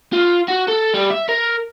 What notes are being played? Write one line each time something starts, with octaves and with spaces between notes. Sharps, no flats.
F4
F#4
A4
G3
E5
A#4